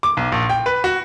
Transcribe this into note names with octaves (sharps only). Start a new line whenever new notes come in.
D6
B1
A#1
G5
B4
F#4